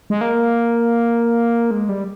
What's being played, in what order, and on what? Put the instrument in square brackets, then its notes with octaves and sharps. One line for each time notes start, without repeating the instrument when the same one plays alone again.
[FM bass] G#3
A#3
G#3
G3